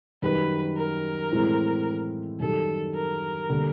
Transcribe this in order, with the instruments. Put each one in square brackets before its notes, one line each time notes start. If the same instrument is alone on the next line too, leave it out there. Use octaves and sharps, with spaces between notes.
[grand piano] F#2 D#3 G3 [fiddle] B4
[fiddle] A#4
[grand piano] A2 E3 G#3 C4 E4
[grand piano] F#2 D#3 G3 [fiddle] A4
[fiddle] A#4
[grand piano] D3 G3 A#3